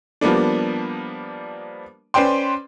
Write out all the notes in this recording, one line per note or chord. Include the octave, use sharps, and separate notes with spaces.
F3 G3 A#3 B3 D4
C#4 B4 C5 D5 G5 C6